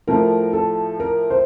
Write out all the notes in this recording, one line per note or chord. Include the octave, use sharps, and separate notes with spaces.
A2 F3 A3 A#4
A4
A#4
C5